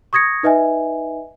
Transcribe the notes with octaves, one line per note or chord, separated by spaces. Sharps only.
C#6 D#6 G#6 A#6 C#7
D#4 B4 D#5 E5 G#5